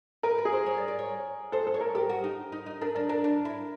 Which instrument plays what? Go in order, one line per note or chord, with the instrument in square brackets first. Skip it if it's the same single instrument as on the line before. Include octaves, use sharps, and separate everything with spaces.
[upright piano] A#4 [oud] B4
[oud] B4
[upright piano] G#4
[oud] C5
C#5
D5
D5
C#5
[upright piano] A4 [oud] C5
[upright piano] A4
[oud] C#5
[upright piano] A#4
[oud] G4 [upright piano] A#4
[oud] F#4
D#4
D#4
D#4
[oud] D4 [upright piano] A#4
[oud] D4 [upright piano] A#4
[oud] D4 [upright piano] A#4
[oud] D4
E4